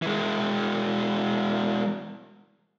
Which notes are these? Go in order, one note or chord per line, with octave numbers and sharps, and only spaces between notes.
E3 G#3